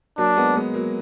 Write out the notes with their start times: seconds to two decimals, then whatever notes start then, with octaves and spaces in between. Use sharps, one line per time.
0.18 F#3 A#3 D4
0.36 G#3 B3
0.56 G#3 B3
0.74 F#3 A#3